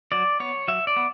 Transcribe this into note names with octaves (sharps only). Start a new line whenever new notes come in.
F#3 D5
B3 C#5
F#3 E5
D5
B3